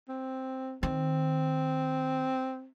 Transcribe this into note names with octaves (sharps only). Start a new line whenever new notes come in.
C4
D#3 C4